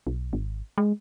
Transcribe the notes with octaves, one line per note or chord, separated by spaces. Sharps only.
B1
G#1
G#3